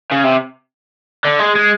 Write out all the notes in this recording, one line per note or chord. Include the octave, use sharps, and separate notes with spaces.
C#3
C3
D3
G#3
G#3